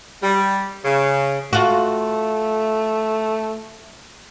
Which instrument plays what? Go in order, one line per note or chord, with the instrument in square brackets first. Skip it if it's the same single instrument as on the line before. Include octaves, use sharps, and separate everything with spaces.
[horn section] G3
C#3
[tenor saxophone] A3 [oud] F4 F#4